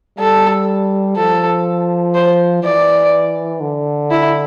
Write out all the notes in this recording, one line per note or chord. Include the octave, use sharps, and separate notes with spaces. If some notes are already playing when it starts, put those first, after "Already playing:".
G3 A4
F3 A4
C5
E3 D5
D3
E4